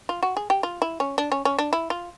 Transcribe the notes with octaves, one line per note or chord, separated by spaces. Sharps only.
F4
F#4
G#4
G4
F4
E4
C#4
D4
C#4
C#4
D4
E4
F4